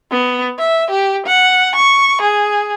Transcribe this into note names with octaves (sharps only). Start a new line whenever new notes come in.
B3
E5
G4
F#5
C#6
G#4